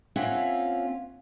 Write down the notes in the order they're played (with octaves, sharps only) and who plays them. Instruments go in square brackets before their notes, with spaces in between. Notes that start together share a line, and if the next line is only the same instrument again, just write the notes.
[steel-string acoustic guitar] A#3 C4 C#4 F4 E5 F#5